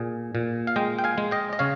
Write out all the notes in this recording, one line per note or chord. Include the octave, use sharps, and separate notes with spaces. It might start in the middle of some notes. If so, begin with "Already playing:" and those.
Already playing: A#2 G#4
A#2
F5
G#3 D#5 G5
G5
F5 G#5
G#3
D#5 G5
D#5
C#3 C#5 F5